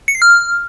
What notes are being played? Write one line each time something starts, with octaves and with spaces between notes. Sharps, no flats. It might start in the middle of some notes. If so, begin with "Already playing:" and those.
C#7
C7
F6